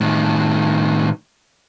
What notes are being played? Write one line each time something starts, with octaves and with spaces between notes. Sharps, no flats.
A2 D#3